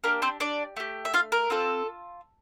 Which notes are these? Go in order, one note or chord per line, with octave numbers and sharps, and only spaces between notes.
A#3 D4 G4 A#4
C4 C5
D4 D5
A3 E4 G4
E5
F4 F5
A#4
C4 F4 A4